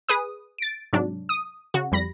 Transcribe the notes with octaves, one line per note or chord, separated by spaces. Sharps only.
G#4 B4 D#6
A6 D7
G#2 C3 F#3 D4
D#6
C#3 F#4
F2 G3 B5 A#6